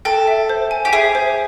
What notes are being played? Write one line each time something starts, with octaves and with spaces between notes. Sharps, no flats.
A4 G5
E5
C5
G#5
G4
G#4 E5
C5